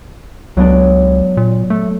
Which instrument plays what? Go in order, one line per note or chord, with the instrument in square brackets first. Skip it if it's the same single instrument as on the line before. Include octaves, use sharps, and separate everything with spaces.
[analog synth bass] C#2 [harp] F#3 B3 D4
[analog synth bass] A#2
[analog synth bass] A3 [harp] A4